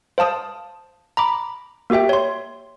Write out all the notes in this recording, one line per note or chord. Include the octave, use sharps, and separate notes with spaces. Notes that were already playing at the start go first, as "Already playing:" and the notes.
C5 F5 A5 D#6
A#5 B5 D6
A#3 F#4 G4 E5 G5
C#5 C6